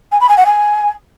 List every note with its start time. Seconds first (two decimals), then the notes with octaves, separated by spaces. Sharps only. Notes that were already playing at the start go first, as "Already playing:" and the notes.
0.12 G#5
0.20 B5
0.29 G#5
0.37 F#5
0.45 G#5